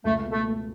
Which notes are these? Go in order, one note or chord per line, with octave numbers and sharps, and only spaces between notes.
C#2 A3
B2
A3
A3